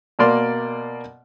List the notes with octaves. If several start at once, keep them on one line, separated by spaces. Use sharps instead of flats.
B2 A#3 D5 C6 F6